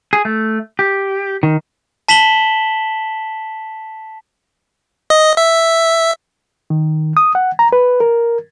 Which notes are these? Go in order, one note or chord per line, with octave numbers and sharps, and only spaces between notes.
G#4
A3
G4
D#3
A5 B6 E7 F#7 G7
D#5
E5
D#3
D#6
F#5
A#5
B4
A#4